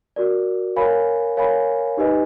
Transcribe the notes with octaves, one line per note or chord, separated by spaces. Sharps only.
F#4 A#4 D5
A#4 C#5 F5 G#5 B5
A#4 C#5 F5 G#5 B5
D#4 G4 B4 D#5 G#5